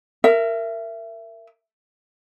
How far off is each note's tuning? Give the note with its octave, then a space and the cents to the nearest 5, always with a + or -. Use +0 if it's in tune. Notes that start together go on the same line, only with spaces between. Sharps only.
A#4 -15 E5 +20